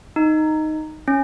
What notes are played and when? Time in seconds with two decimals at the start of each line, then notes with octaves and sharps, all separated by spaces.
0.16 D#4
1.08 C#4